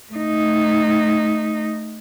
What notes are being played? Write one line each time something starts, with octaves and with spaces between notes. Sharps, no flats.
A3 D#4